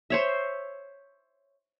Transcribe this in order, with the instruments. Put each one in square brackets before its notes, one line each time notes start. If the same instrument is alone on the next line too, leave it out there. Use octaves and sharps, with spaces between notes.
[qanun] C5 C#5 E5